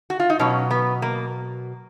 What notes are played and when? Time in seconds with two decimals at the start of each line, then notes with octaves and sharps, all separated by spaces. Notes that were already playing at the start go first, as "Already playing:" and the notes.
0.10 F#4
0.20 F4
0.30 D#4
0.39 B2 F#3 C#4
0.71 B3
1.02 A#3